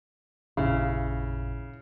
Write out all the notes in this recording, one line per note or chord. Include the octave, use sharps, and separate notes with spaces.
A1 F2 A#2 C#3 E4 F5